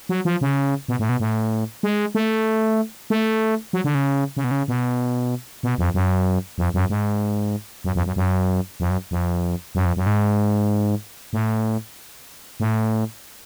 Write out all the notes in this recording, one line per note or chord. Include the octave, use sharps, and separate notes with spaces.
F#3
F3
C#3
B2
A2
B2
A2
G#3
A3
A3
F#3
D3
C#3
C#3
B2
C#3
B2
B2
F2
F#2
F2
F#2
G#2
F#2
F2
F#2
F#2
F2
F#2
F2
F#2
F2
F#2
G#2
A2
A2